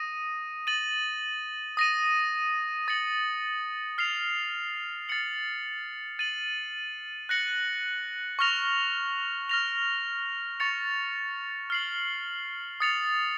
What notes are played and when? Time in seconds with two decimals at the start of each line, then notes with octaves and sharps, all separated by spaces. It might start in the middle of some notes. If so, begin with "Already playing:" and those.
Already playing: D#6 A#6 D#7
0.67 A6 D#7 F#7
1.77 D#6 A#6 D#7
2.88 D#6 A6 C#7 F#7
3.98 F6 C7 F7
5.09 A6 C#7 F#7
6.19 A6 D#7 F#7
7.29 F#6 A#6 C#7 F#7
8.39 C#6 F6 A#6 F7
9.49 F6 A#6 F7
10.60 C#6 A6 C#7 F7
11.70 F6 C7 F#7
12.80 D#6 A6 C#7 F7